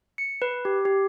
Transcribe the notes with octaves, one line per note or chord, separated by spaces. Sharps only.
C#7
B4
G4
G4